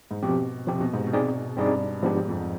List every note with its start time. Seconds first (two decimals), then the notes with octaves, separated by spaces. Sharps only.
0.11 G#2
0.23 B2 F3 C4 G4
0.67 C3 F3 C4 G4
0.81 B2
0.93 G#2
1.07 B2
1.13 C4 D#4 G#4 D5
1.57 G2 C4 D#4 G#4 D5
2.03 G#2 F3 B3 D4 G4
2.29 F2